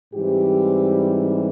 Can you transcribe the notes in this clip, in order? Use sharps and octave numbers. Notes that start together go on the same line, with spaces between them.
G#2 E3 G3 C4 G4